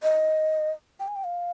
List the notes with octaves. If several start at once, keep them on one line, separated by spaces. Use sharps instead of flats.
D#5
G5
G#5
G5
F5